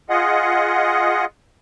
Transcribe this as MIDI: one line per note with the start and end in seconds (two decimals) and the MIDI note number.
0.10 1.25 65
0.10 1.25 68
0.10 1.25 75
0.10 1.25 78